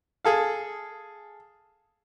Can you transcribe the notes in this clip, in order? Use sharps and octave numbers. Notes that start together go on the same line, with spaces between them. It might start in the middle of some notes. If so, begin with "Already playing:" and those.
G#4 A4 F5